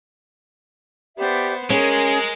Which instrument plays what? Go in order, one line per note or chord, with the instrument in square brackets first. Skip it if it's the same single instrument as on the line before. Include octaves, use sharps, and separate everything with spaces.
[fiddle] B3 C5 [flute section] G4 D5 E5
[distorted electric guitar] G#3 [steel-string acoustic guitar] C#4 [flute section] G#4 [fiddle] A#4